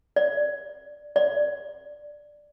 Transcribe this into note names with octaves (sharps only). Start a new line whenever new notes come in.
D5
D5